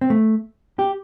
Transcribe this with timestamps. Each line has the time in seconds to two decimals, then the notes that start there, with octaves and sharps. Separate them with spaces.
0.01 C4
0.10 A3
0.79 G4